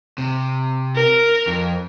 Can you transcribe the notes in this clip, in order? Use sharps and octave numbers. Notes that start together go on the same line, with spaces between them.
C3
A#4
F2